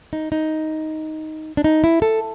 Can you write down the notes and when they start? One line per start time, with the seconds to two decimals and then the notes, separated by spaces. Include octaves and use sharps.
0.13 D#4
0.32 D#4
1.57 D4
1.64 D#4
1.84 E4
2.02 A4